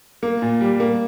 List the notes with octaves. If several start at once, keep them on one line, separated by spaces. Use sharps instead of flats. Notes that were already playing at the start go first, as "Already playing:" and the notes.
A#3
A#2
G3
A#3